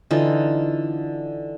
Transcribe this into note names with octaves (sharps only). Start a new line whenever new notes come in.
D3 E3 D#4 F4